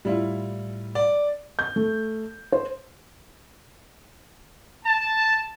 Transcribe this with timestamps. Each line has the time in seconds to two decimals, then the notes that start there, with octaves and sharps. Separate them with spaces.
0.05 A2 G3 E4 F4
0.95 D5
1.59 G6
1.76 A3
2.52 C5
4.85 A5